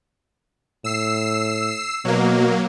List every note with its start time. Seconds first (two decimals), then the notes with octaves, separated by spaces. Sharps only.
0.84 A2 E6 C7
2.05 B2 F#3 A#3